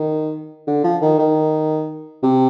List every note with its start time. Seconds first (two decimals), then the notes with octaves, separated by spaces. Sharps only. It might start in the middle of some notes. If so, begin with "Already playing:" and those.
Already playing: D#3
0.67 D3
0.84 F3
1.02 D#3
1.19 D#3
2.23 C3